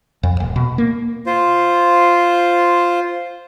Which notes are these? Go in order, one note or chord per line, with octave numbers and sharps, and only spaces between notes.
F2
D#1
B2
A#3
F4 C5